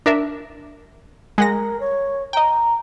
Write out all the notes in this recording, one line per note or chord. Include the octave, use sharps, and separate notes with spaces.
D4 A#4 E5
G#3 A#4 F#5 A#6
C#5
D#5 G5 A#5